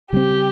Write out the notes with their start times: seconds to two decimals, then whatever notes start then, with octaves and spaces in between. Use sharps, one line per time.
0.12 C#3 G3 C4 G4